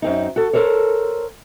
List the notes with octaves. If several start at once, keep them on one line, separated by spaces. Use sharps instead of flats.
F#2 C4 D#4
F#4 A4
A4 A#4 C5 C#5